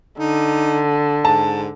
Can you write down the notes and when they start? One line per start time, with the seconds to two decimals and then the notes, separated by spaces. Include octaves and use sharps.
0.20 D3 D#4
1.25 G#2 A5